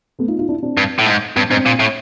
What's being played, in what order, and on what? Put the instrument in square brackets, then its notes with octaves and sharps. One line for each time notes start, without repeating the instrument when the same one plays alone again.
[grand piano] A3 B3
D#4 F4
D#4 F4
D4 E4
C4 D4
[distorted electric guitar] G2
A2
G#2
[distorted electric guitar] G2 [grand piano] B3 C#4
[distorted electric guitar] G#2 [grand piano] C4 D4
[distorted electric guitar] A#2
A2